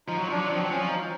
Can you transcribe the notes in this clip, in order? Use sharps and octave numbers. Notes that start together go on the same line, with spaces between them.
F3 D#4
F#3
F3 D4
F#3
F3
F#3 C4
F3 C#4
D#4